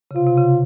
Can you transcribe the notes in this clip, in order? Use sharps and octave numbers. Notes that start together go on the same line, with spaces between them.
C#3
C3 F4
C3
C#3